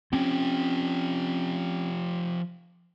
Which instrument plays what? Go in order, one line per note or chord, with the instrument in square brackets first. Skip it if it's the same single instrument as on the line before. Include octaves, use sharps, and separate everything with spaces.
[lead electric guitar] F3 G4 [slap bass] C4 C#4